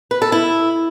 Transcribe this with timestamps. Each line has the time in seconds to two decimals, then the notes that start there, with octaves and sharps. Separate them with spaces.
0.11 B4
0.22 A4
0.32 E4